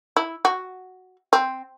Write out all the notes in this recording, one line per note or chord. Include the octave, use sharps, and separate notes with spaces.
E4
F#4
C4